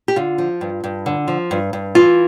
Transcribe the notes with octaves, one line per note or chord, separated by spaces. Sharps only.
G4
D3 F4
F3
G2
G2
D3
F3
G2
G2
E3 F4